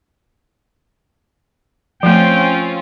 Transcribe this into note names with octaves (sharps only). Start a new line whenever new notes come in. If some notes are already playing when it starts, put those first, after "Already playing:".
F3 A3 C4 C#4 F4 G5